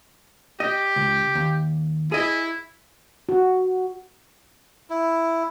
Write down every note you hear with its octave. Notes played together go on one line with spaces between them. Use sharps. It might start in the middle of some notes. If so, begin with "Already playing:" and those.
G4 D#5
C#2
D#2
E4 G#4 D#5
F#4
E4